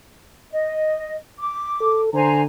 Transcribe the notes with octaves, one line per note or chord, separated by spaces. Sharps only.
D#5
D6
A4
D3 C5 G#5 A#5